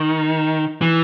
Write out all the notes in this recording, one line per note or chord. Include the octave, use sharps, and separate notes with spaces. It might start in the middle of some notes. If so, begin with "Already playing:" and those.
Already playing: D#3
E3